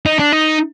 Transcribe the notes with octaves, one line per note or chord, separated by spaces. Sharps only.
D#4
D4
D#4